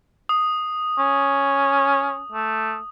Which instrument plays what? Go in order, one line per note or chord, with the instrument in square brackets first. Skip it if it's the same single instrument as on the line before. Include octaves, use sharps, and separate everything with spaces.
[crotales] D#6
[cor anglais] C#4
A3